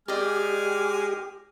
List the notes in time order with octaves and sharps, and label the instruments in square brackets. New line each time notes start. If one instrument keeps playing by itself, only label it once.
[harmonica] G#3 G#5 F6 [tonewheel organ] G4 [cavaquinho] D5 D#5